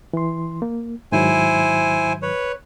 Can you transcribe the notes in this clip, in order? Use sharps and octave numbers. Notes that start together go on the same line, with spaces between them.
E3 C6
A#3
G#2 D#3 F#3 E4 C5 G#5
B4 C#5